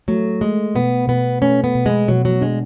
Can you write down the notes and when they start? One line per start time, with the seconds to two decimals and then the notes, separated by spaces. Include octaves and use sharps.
0.08 F#3 A3
0.41 G#3 A3
0.75 B2 B3
1.08 B2 B3
1.41 A3 C#4
1.64 B3
1.75 B2
1.86 G#3
2.08 B2 F#3
2.25 F#3
2.41 G#3 D4